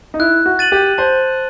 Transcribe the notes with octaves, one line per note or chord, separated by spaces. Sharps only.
D#4
E4 F#6
F#4
A6 D#7 F#7
G4
C5 A5